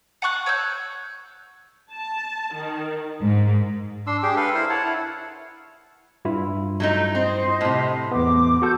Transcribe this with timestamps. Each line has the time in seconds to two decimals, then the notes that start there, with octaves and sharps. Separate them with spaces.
0.22 F#5 A5 C#6 F#6
0.46 C#5 E6 F#6 G6
1.92 A5
2.55 D#3
3.21 G#2
4.07 D4 C6 E6
4.23 D4 G4 G#4 G5
4.37 A4 B4 F5 C6
4.55 E4 A#4 C5
4.70 C#5 F#5 A5
4.84 E4
6.25 G2 E4 F4
6.80 F#3 A3 D#4
7.15 C4 C5 D#5
7.61 A2 C3
8.12 E2 B3 D6
8.62 F#4 A4 G6